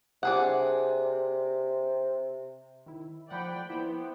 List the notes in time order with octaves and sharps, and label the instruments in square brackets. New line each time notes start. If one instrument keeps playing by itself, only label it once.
[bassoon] C3 [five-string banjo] D4 G#4 F#5
[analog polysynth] D#3 E4
[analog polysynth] F3 F#5 [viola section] D5 G5 B5
[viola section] B3 [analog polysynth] E4 C5 G5